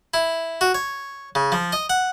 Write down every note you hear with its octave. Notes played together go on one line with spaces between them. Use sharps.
E4
F#4
C#5
C#3
F3
D#5
F#5